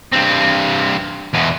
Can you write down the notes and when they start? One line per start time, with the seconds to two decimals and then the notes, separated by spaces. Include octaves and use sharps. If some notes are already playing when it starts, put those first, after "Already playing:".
0.12 G2 C4
1.34 E2 B2